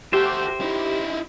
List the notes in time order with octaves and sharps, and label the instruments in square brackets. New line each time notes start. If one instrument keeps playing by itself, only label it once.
[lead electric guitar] F#4 A4 [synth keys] G4 [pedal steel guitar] C5 E5 G5
[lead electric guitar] D#4 E4